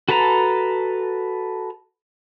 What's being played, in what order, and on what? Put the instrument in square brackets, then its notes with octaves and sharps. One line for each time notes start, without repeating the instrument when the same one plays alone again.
[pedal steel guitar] F#4 A4 B4 A5 A#5